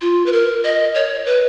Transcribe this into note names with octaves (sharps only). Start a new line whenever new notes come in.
F4
B4
A#4
D#5
C#5
B4